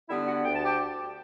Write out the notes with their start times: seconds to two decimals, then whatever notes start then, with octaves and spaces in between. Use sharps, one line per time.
0.09 D3 G3 B3 E4 E5
0.27 F#4 F#5
0.44 D2 G5
0.55 A5
0.64 G4 G5